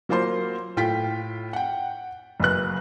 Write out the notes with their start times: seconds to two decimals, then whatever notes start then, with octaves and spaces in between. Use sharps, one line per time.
0.09 F#3 A#3 F4 C5 C6
0.77 A2 F4 G5 B6
1.53 F#5 G5
2.39 F#1 F#2 B4 F#6